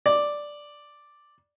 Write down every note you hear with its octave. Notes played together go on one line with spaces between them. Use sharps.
D5